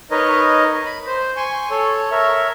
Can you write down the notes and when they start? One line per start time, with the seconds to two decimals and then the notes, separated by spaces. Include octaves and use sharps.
0.11 D#4 A#4 B4 C#5 D#5
0.85 B5
1.07 C5
1.37 G#5 C6 C#6
1.70 A4 C#5
2.11 A#4 C#5 E5